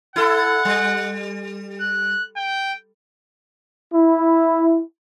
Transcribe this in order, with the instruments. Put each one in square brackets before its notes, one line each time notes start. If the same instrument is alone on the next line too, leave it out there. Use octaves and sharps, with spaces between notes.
[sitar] E4 A4 [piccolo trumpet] F#5
[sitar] G3
[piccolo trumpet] F#6
G5
[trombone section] E4